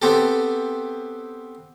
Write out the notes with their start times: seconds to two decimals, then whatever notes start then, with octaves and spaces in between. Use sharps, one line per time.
0.02 B3 C4 G4 A4